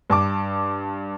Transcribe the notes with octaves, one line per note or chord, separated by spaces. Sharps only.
G2 A5 D6